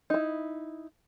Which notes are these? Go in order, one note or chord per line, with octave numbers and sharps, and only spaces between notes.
D#4 E4